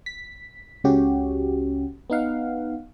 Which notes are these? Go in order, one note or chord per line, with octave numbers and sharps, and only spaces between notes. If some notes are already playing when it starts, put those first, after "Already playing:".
B6
C#2 C#3 C#4 F#4 G4
B3 D#4 F5 F#5